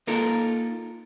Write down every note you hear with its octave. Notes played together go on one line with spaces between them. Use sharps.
A#3 D#4 F4 A4 A#4